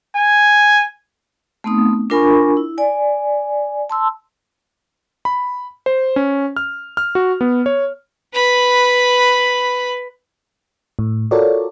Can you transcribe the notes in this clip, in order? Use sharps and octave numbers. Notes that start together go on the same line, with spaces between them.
G#5
A3 B3 C4 D#4 D#6
D4 F4 A#4 G#5 B5 C#6
E4
D5 G#5
A5 C6 E6
B5
C5
C#4
F6
F6
F#4
B3
C#5
B4 B5
A2
F4 F#4 A4 A#4 C#5 D5